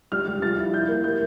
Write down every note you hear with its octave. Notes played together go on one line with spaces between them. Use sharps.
G3 F6
G3
F3 A6
E4
E4 G6
A#3
G3 G6